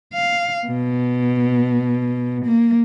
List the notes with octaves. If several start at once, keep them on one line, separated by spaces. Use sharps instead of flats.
F5
B2
A#3